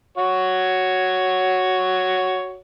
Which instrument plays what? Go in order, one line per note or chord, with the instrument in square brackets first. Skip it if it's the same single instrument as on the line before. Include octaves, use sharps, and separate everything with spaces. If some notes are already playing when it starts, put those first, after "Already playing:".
[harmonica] F#4 C#5